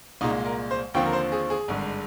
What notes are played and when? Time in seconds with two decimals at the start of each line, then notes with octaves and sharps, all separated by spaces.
0.21 C2 A#2 G#3 D#4
0.46 A#4
0.71 C5
0.94 D#2 D3 F3 C4 G5
1.06 A#4
1.13 C5
1.32 G#4
1.50 G#4
1.68 G#1 G2 D3 G#3